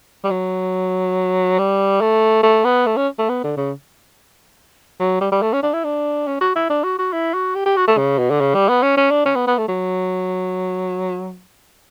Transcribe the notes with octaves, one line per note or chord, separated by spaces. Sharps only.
G3
F#3
G3
A3
A3
B3
A3
C#4
A3
B3
D3
C#3
F#3
G3
G3
A3
C#4
D4
E4
D4
C#4
F#4
E4
D4
F#4
F#4
E4
F#4
G4
G4
F#4
A3
C#3
B2
D3
C#3
G3
B3
C#4
C#4
D4
C#4
B3
B3
A3
F#3